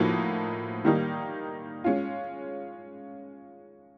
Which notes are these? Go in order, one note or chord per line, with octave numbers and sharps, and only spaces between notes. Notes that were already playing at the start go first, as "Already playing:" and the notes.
Already playing: A2 F3 A#3 D#4 F#4
D#3 G3 A#3 D#4
G#3 C#4 F4